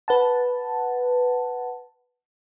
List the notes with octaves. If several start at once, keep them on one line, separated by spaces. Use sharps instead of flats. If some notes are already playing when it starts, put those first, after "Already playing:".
B4 F#5 A5